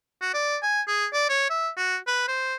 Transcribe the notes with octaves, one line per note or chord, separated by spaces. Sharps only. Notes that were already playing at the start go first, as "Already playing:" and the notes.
F#4
D5
G#5
G#4
D5
C#5
E5
F#4
B4
C5